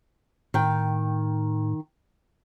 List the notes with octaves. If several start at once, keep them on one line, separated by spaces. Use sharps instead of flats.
A2 D#3 G5